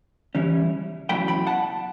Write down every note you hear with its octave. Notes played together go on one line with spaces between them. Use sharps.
C#3 E3 G3 C#4 E4
E2 C#3 F#3 A3 E4 G5 B5
G5 B5
F#5 A5